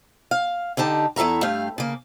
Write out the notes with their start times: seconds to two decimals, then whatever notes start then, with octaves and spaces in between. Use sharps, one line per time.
0.31 F5
0.77 D3 D#4 G4 A5
1.16 E2 E4 A4 E5 A#5
1.42 G2 A3 G4 F5
1.78 C#3 A#3